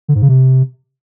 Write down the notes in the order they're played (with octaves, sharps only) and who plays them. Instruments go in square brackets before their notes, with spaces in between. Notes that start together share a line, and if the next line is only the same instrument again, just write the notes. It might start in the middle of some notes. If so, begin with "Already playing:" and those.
[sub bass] D3
G#2
C#3
C3